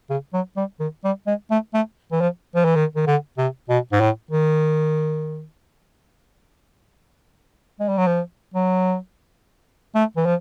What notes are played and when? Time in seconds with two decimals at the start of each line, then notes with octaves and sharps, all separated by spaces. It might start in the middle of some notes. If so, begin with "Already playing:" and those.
0.10 C#3
0.34 F#3
0.57 G3
0.80 D#3
1.04 G3
1.27 G#3
1.51 A3
1.74 A3
2.12 E3
2.21 F3
2.55 F3
2.65 E3
2.75 D#3
2.95 D#3
3.07 D3
3.38 C3
3.69 B2
3.92 G#2
4.01 A2
4.31 D#3
7.80 G#3
7.89 G3
7.98 F#3
8.07 F3
8.54 F#3
9.95 A3
10.16 E3
10.26 F3